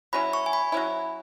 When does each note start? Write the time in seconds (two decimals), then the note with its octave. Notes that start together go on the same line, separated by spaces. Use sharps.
0.13 F#3 C#4 E4 B5
0.33 C#6
0.46 G#5
0.53 B5
0.72 F#3 C#4 E4